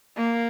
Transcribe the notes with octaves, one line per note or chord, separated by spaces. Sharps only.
A#3